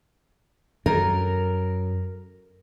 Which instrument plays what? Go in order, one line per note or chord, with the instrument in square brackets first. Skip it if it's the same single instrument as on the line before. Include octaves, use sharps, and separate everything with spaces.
[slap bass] F#2 [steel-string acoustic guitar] A#4